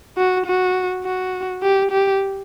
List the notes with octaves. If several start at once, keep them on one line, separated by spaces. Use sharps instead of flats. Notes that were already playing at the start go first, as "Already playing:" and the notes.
F#4
F#4
F#4
G4
G4